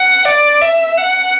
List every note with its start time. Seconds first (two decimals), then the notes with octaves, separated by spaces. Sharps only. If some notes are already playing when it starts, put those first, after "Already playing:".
Already playing: F#5
0.25 D5
0.62 E5
0.98 F#5